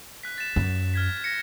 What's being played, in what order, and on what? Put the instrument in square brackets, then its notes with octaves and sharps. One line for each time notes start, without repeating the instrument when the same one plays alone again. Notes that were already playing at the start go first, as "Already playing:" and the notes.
[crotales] F#6 B6
A6 E7
[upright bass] F#2
[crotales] F6 G#6 B6
G#6 A#6 C#7